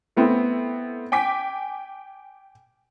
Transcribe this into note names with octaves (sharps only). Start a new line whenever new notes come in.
A3 B3 C4 E4
G5 G#5 D6 B6